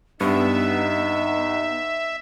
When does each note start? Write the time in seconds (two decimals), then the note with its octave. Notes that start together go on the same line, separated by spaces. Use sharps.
0.21 G2 B3 D#4 B4 E5